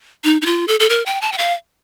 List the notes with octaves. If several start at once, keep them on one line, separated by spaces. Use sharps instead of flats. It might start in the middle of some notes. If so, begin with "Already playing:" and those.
D#4
D#4
F4
A4
A4
A#4
G5
A5
G5
F5